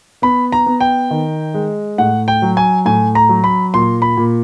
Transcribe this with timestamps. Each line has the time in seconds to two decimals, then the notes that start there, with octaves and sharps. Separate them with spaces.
0.22 B3 B5
0.52 A#5
0.66 B3
0.80 G5
1.10 D#3
1.54 G#3
1.98 A2 F#5
2.28 G5
2.42 F#3
2.57 G#5
2.85 A2 G#5
3.15 A#5
3.29 F#3
3.44 B5
3.74 A#2 C6
4.02 B5
4.17 A#2